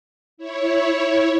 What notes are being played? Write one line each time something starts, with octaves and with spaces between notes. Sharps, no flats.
E4 C#5